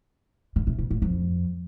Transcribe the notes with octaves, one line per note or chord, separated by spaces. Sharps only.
D3
C3
B2
A2
F2